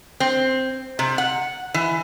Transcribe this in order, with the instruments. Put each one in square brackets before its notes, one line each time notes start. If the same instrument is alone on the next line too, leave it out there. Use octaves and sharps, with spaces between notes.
[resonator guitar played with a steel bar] C4
C3
F#5
E3